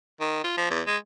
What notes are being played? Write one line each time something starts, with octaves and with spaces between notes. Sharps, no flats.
D#3
F4
F3
E2
G#3